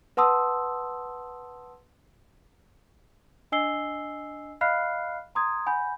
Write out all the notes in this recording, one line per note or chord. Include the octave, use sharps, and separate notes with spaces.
B4 F#5 A5 C6 D#6 E6
D4 D#5 G#5 E6 C7 G7
D#5 F5 B5 F6 F#6 C7
A#5 C6 D#6 G#6
F#5 G#5 B5 G6